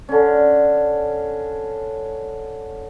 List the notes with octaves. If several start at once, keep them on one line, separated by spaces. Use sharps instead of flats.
D3 C#4